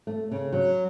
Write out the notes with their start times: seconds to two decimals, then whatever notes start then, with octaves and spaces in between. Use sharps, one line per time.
0.07 A3
0.31 C#3
0.53 F#3